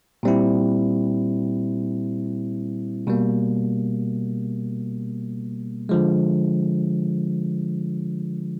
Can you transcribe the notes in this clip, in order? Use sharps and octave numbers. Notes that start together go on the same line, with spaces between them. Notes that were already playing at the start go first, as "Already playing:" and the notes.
A#2 G3 C4 E4
B2 G3 A#3
D3 F3 G#3